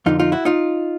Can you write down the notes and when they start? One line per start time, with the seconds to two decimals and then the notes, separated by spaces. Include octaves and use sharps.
0.06 F2 D3 D#4 F4
0.20 D#4 F4
0.32 E4 F#4
0.45 D#4 F4